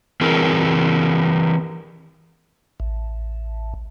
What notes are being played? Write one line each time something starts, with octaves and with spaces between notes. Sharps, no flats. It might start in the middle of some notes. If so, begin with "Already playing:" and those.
E3 C4 G#4 A#4
A1